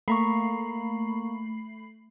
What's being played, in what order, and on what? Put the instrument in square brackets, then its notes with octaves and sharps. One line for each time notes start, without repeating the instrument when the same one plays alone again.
[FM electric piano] A3 B5 C7 [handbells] A#3 A#5 C#6